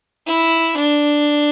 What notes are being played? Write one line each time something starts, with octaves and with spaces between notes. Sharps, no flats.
E4
D4